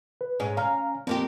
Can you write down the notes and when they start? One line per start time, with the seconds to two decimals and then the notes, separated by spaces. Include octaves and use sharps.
0.21 B4
0.40 G#2 C#4 G#4
0.57 C#4 F5 A#5 F6
1.07 F2 A#3 C4 G4